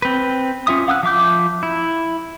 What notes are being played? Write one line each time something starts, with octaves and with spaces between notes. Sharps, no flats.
C4 B4
C#4 F4 E5 D#6
F5 F#5 D#6 E6 F#6
F3 E5 D6 G6
E4